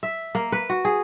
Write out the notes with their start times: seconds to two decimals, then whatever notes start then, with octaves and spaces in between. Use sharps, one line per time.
0.03 E5
0.35 A#3
0.52 B4
0.70 F#4
0.85 G#4